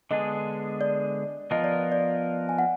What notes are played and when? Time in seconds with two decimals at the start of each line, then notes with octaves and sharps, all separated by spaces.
0.11 D3 G#3 B3 D4 G#4 D#5
0.81 D5
1.51 F3 B3 F4 A#4 D#5
1.64 D5
1.92 D5
2.49 G#5
2.59 F#5